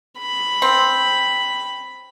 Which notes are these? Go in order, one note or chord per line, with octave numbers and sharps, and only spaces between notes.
B5
C4